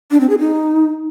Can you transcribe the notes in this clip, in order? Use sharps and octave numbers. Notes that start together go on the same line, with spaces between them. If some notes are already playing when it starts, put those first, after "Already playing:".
D4
C4
G#4
D#4